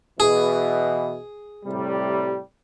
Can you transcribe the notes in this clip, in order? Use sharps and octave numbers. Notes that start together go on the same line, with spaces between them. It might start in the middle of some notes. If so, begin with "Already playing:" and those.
B2 E3 G#4
A2 C3 G3